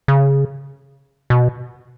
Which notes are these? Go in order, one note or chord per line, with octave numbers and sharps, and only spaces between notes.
C#3
B2